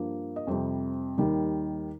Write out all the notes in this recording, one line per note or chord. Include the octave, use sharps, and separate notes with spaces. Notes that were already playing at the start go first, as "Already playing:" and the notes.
Already playing: G2 F3 A#3
D#5
F2 C3 G3 C5
D#2 D#3 G3